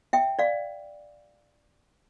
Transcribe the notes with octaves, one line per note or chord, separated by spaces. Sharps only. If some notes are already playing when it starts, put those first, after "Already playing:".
E5 G5
D5 F5